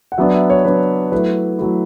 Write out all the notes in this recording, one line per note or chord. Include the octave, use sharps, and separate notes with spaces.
F#5
F#3 B3 D4 E5
E5
C#5
F#3 B3 D4 B4
F#3 A3 E4 B4
F#3 A3 E4